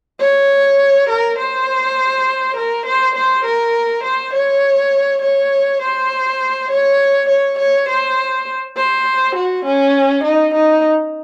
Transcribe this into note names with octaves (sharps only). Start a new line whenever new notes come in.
C#5
A#4
C5
A#4
C5
C5
A#4
C5
C#5
C#5
C5
C#5
C#5
C#5
C5
C5
F#4
C#4
D#4
D#4